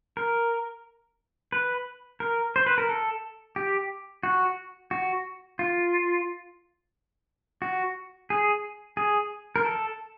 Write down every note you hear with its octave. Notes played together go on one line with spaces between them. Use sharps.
A#4
B4
A#4
C5
B4
A#4
A4
G4
F#4
F#4
F4
F#4
G#4
G#4
A#4
A4